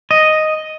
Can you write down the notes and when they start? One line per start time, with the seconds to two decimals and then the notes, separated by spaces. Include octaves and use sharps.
0.11 D#5